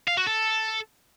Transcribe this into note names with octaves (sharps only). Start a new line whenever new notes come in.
F5
F#4
A4